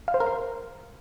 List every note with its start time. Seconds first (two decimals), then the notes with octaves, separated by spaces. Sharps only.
0.08 F5
0.14 C5
0.20 A#4
0.27 C6